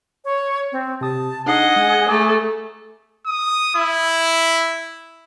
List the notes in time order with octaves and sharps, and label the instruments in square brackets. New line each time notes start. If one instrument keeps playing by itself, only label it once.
[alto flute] C#5
C4
[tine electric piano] C3 D#6 [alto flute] A5
[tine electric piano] D4 D#4 C7 [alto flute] G#4 [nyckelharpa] D#5 F#5
[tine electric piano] G#3
[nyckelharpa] A3 A4 [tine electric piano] A#5 D6
[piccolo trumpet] D#6
E4